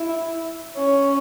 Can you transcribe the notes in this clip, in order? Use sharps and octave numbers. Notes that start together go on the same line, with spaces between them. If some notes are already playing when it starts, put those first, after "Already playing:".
Already playing: E4
C#4